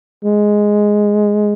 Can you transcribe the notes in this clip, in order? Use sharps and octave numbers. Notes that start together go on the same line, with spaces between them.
G#3